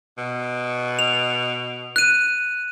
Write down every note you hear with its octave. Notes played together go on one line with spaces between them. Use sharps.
B2
F7
F#6 D#7